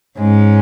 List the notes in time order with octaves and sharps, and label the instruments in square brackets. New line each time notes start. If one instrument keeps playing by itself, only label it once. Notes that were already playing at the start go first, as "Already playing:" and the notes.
[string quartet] G#2 G#3 C#4